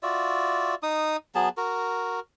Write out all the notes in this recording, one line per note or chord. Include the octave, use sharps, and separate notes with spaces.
F4 F#4 D5 E5
D#4 D#6
F#3 B3 G#4 A5
F#4 A#4